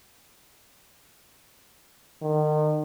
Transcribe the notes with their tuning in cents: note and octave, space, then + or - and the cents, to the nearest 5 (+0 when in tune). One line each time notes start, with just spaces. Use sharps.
D#3 -35